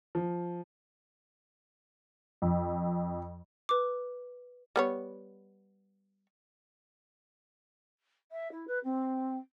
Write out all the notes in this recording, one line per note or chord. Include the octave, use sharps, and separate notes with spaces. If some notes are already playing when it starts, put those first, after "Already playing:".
F3
F2
B4 D6
G3 B3 C#5
E5
E4
B4
C4